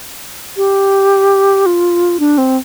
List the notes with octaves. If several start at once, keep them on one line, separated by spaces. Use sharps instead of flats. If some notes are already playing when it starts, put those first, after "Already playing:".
G4
F4
D4
C4